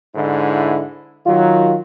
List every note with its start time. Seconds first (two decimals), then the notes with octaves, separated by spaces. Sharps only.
0.15 G#2 D3 E4
1.26 D#3 F#3 F4